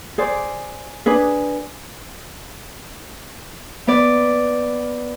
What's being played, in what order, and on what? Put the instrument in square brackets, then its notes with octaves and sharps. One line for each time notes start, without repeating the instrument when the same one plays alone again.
[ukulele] G#4 C5 D5
D4 G#4 B4
[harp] B3 D5